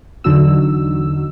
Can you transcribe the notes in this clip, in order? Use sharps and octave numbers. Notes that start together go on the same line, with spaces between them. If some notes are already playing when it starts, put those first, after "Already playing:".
E2 D3 F#3 D#4 F#4 E6